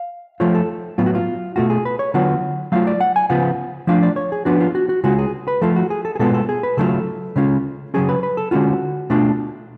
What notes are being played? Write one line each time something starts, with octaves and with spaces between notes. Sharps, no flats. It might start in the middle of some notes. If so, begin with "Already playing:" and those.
Already playing: F5
F3 A3 F4 C#5
A4
A2 F#3 B3 F4
F#4
F4
B2 A3 F4 F#4
G#4
B4
C#5
D3 F#3 B3 F4 F#5
F#3 A3 F4 F5
D5
F#5
G#5
C#3 F3 B3 F4 F#5
F3 A3 D4 F4 F5
D5
C#5
G#4
F3 B3 D4 F#4
F4
F#4
F#4
C#3 G#3 C#4 F4 F#4
G#4
B4
F3 A3 F4 A4
F#4
G#4
A4
G#4
B2 G#3 B3 F4 A4
A4
G#4
B4
C#3 F#3 A3 D4 F4 A4
C#3 G#3 C#4 F4
C#3 F#3 C#4 G#4
B4
B4
A4
D3 G#3 C#4 F4 F#4
B2 A3 D4 F4